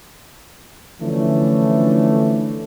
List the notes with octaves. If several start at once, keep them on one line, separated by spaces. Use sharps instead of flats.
D3 E3 F3 A3 C#4 D4